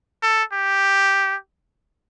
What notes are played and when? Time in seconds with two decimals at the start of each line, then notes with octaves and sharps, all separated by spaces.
0.23 A4
0.53 G4